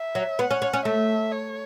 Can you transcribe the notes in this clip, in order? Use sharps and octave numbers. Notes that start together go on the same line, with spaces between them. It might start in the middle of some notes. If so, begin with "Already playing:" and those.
Already playing: E5
F#3
B3 F#5
C#4
C#4
C#4
A3 E5
C#5